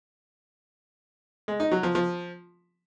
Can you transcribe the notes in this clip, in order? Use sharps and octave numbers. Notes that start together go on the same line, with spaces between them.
G#3
D#4
F#3
F3
F3